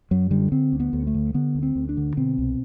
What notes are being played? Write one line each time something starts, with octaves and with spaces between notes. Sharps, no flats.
F#2 F#3
D3 G3
D3 C4
D2
B3
D2
A3
D3
D3 B3
D2
C4
D2
D4
D3
B2 C4
C2